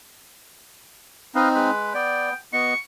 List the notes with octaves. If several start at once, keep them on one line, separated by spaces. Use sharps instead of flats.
C4 D#4 B4 D#5 F5
G#3 B4 B5
B3 D5 G5
B3 F#4 D#5 C#6